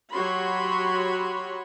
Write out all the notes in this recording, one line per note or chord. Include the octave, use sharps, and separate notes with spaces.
F#3 F#4 G4 C#5 B5 C6